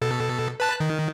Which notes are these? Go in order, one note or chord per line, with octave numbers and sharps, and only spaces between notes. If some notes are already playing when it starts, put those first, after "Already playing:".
B2 A4
B4 A5 F#6
D#3